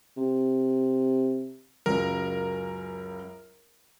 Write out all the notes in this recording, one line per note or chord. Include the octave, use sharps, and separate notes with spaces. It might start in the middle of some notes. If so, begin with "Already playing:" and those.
C3
C#2 F#2 C#3 A#4